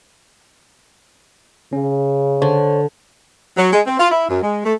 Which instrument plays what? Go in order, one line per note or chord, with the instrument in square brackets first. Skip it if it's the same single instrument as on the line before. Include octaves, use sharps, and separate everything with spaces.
[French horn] C#3 [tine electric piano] C#4
[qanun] D3 [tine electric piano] C5 C#5
[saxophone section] F#3
G#3
C4
F4
E4
F#2
G#3
A3